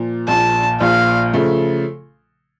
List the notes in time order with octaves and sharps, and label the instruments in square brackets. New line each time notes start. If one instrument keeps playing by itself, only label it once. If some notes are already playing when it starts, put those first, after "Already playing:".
Already playing: [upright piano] A#2 F3
[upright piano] A#1 A#2 F3 [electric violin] A5
[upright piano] A#1 A#2 F3 [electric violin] F5
[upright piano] C#3 F3 A3